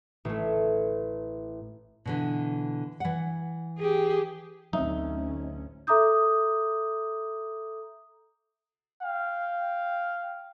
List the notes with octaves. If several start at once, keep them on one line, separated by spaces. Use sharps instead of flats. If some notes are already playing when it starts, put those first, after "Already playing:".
A1 A3
B2 D3 E3
E3 F#5
G4 G#4
A1 D2 F#3 C4 C#4 D#4 E5
A4 E5 A#5 D6 D#6 G6
F5 G5